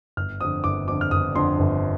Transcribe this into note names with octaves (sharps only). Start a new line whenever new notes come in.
G1 F6
F2 D3 D#6
G1 D6
F2 D3 D6
F6
G1 D#6
F2 D3 C6
G1